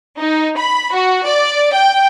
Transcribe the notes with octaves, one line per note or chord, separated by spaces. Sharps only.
D#4
B5
F#4
D5
G5